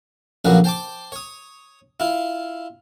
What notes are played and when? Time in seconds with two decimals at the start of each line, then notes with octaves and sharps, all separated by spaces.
0.45 A#1 F2 C#3 F#3 A#3 B4
0.64 C5 G5 A5 C6 D6
1.12 C#5 D#6
2.00 E4 F4